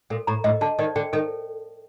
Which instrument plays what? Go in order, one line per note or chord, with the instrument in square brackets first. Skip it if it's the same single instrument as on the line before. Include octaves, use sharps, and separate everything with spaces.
[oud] A#2 [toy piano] A4
[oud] A2 [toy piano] A#5
[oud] A2 [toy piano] D#5
[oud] D3 [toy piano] A5
[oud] D#3 [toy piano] D5
[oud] D3 [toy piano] G5
[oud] D#3 [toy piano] A4